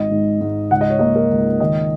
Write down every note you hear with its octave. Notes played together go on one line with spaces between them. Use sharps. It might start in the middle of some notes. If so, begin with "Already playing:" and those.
Already playing: G#1 D#5
G#2
G#2
C#2 F#5
D#5
C#5
A#3 D#5
A#4
C#2
D#3 D#5